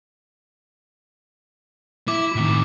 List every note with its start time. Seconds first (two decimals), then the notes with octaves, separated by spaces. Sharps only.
2.08 E4 D6
2.36 A2 D#3